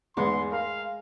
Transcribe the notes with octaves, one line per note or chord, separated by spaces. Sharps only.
E2 G#2 G#3 B3 C6
A#4 F5 C6